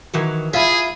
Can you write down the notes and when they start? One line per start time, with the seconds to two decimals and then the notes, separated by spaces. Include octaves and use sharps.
0.14 D#3 E3 F#3
0.53 E4 F4 G#4 E5